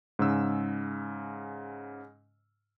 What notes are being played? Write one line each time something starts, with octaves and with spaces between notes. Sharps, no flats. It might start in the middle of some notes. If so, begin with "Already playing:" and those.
G#2 C#3 E6